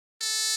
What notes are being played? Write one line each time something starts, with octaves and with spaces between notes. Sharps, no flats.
A4